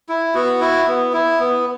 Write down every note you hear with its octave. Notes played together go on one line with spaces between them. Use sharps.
E4
B3 F#4
E4
B3
E4
B3